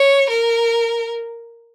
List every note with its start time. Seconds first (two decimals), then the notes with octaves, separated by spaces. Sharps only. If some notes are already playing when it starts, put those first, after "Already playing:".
Already playing: C#5
0.30 A#4